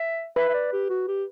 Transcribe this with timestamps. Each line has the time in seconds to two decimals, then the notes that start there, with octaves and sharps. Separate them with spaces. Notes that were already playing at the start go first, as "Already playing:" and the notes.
Already playing: E5
0.36 B4 E5
0.49 E5
0.54 D5
0.73 G4
0.89 F#4
1.08 G4